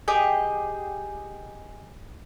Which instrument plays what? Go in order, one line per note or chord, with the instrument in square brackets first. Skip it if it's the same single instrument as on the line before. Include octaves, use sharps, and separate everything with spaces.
[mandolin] G4 G#4 D#5 G5